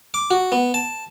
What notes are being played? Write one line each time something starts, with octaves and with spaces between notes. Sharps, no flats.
D6
F#4
B3
A5